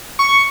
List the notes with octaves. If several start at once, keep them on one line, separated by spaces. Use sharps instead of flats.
C#6